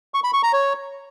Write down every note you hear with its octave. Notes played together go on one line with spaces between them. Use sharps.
C#6
B5
C#6
A#5
C#5